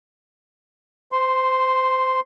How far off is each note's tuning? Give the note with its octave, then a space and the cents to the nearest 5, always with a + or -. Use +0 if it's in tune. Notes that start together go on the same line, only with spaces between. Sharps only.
C5 -20 C6 +0